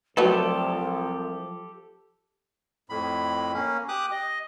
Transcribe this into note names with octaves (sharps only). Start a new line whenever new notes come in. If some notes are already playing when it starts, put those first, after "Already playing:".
C2 F3 F#3 A3 G4 A4 B4
F2 A2 B5
A#3 C#4
G4 D6 D#6 F#6
D#5